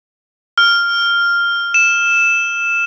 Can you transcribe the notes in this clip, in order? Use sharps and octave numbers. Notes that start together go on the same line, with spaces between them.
F6
E7